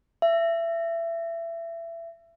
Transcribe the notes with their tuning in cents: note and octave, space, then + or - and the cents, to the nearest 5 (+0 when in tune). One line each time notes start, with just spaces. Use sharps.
E5 +25